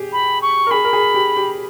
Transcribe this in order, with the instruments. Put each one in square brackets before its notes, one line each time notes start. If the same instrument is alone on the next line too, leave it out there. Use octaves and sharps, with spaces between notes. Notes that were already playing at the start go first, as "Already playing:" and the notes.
Already playing: [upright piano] G4 G#4
[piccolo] B5
C#6
[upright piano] A#4
[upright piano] G#4 [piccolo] B5
[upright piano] A#4
G#4
G4
G4